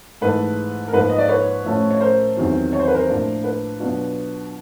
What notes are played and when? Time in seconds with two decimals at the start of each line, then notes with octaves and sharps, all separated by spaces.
0.21 G#2 E3 A3 B4
0.88 A#4
0.93 G#2 F3 A#3 B4
1.09 D#5
1.19 D5
1.28 B4 C#5
1.65 A2 F3 A3 C#4 F4
1.91 C#5
2.00 A#4 C5
2.37 E2 C3 D#3 F#3
2.73 C#5
2.79 C5
2.88 B4
2.94 A#4 C5
3.08 A2 F3 A#3 D4
3.44 B4
3.80 B2 F#3 B3 D4 F4